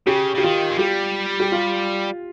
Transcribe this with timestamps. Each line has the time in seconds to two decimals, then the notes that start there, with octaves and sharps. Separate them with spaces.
0.07 C#3 G4
0.35 C#3 G4
0.43 D#3 F4
0.71 G#3
0.79 G3 G4
1.40 G4
1.52 F4